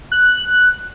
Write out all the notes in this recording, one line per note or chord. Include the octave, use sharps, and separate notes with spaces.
F#6